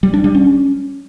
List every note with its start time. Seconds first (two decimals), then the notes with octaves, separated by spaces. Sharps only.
0.03 G3
0.14 D4
0.24 G3
0.35 C#4